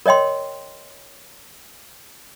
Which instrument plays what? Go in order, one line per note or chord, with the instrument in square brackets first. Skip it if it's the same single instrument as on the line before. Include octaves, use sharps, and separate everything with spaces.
[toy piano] A#4 C#5 D#5 G5 C6